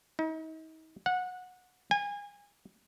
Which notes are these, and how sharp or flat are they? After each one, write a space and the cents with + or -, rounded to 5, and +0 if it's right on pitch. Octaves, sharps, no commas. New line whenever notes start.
D#4 +40
F#5 -20
G#5 -30